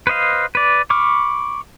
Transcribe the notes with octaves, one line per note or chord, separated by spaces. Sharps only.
B4 C5 D#5 F5
B4 D5
B5 C#6 D6 F6